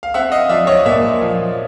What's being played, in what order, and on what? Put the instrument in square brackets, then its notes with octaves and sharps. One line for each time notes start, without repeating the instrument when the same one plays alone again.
[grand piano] F5
C4 E5 F#5
D#5 F5
F3 D5 E5
C#5 D#5
A#2 D5 E5
F3